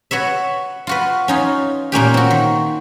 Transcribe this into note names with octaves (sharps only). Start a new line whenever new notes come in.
F#4 B4 C#5 E5
F4 F#4 B4
C#4 D#4 F4
A#2 A#3 C#4 G4
C4 F#4
D#3